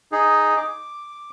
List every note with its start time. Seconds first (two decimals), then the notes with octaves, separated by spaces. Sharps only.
0.12 D#4 G#4
0.57 D6